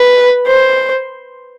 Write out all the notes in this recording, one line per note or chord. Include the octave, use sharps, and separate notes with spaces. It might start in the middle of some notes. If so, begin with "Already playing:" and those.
Already playing: B4
C5